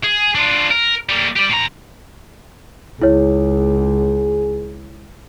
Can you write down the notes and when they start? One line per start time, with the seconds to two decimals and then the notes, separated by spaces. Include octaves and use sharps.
0.04 G#4
0.35 D4 F4
0.71 A#4
1.09 G3 A#3
1.36 G4 D5
1.50 A2 A#5
3.02 C#2 E4 G#4 C#5